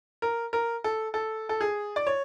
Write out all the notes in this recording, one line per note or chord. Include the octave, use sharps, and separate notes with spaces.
A#4
A#4
A4
A4
A4
G#4
D5
C#5